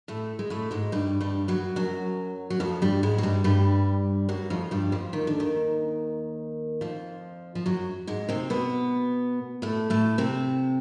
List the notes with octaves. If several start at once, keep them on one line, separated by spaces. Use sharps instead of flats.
A2 A3
G#3
A2 A3
G#2 G#3
G2 G3
G2 G3
F#2 F#3
F#2 F#3
F#3
F2 F3
G2 G3
G#2 G#3
F#3
G2 G3
G2 G3
F#2 F#3
F2 F3
G2 G3
F2 F3
D#3
D3
D#2 D#3
F2 F3
F3
F#2 F#3
G#2 G#3
C3 C4
B2 B3
A2 A3
A2 A3
C3 C4